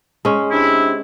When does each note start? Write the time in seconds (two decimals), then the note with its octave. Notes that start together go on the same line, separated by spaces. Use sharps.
0.25 G#3 C#4
0.52 C3 D4 E4